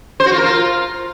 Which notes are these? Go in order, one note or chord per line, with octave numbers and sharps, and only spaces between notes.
C5
F#4
F4
A#4
F4